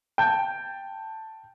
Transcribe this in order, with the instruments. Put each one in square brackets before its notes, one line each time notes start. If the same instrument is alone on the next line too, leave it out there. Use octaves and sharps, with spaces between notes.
[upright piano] G5 A5 G6